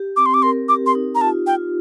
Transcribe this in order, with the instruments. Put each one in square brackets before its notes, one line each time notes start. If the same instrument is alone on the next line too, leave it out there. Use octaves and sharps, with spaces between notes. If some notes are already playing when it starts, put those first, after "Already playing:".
Already playing: [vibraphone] G4
[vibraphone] C4 [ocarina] D6
[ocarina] C6
D6
[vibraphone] A#4 [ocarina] C6
[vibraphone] G4 [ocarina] D6
[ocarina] C6
[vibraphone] D#4
[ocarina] A#5
[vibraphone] F4 [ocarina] A5
[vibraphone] F4 [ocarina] G5